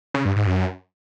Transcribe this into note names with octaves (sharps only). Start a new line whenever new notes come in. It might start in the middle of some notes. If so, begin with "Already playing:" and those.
C#3
G2
G#2
F#2